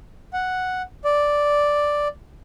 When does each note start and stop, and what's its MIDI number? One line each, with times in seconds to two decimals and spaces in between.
0.33 0.82 78
1.04 2.08 74